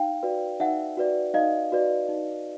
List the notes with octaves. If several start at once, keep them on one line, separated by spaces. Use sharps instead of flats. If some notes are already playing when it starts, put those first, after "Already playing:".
Already playing: D#4 F5 G5
F#4 B4 D5
D#4 E5 F#5
F#4 B4 D5
D#4 D#5 F5
F#4 B4 D5
D#4